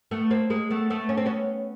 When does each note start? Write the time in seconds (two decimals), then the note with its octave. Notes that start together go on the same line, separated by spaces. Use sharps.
0.11 A3 B3
0.31 A#3 C4
0.50 G#3 A#3
0.70 A3 B3
0.90 A3 B3
1.09 C#4
1.17 C4
1.26 B3 C#4